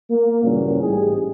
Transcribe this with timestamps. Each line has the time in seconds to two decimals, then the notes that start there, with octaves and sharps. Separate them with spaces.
0.10 A#3
0.44 G2 A#2 C#3 E3 F#3 C#4
0.81 A1 G#2 G3 G4 G#4